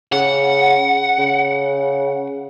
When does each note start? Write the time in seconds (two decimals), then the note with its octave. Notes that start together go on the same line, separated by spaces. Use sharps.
0.12 C#3 F#5
1.18 C#3